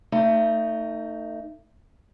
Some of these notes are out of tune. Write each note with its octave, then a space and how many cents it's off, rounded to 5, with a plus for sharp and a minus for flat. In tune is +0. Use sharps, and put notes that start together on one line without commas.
A3 +35 D#4 +0